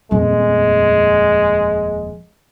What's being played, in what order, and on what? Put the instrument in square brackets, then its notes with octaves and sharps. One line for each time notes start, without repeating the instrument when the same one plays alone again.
[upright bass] D#1 F2 [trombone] G#3